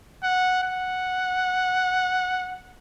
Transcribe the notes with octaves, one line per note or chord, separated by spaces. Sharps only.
F#5
F#5